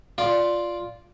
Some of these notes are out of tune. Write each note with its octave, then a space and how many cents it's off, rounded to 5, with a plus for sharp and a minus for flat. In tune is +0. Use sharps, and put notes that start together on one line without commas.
F4 +0 D5 +0